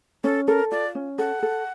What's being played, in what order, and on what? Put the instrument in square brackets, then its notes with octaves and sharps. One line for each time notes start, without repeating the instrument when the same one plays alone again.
[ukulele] C#4 [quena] A4
[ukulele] A4 [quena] A#4
[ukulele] F4 [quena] D5
[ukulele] C#4
[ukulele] A4 [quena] F#5
[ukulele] A4